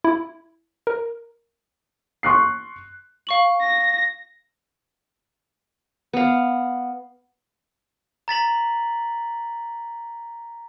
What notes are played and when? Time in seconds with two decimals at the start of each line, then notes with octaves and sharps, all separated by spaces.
0.04 E4
0.87 A#4
2.23 C6 C#6 F#6 C7
3.27 F5 C#6 F#7
3.61 A#6
6.13 B3 F5
8.28 A#5 A6 B6 F#7